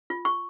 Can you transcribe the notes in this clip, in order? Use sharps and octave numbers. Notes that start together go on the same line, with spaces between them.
F4
C#6